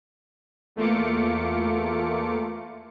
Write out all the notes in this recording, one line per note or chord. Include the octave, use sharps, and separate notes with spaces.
E2 A3 A#3 F4 D6 C#7